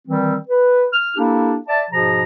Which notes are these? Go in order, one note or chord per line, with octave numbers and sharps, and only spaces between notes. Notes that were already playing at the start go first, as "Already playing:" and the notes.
D#3 E3 G3 C4
B4
F6
A#3 D4 E4 G4 A4
D5 E5 A5
G#2 B2 F3 G#4 A#5